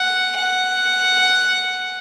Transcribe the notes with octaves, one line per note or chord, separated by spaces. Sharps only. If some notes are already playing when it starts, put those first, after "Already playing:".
Already playing: F#5
F#5